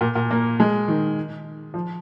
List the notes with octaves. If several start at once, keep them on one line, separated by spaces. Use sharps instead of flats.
A#2
A#2
A#3
G#3
D#3
F3